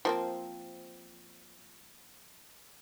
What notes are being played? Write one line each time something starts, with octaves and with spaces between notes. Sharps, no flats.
F3 A#3 C4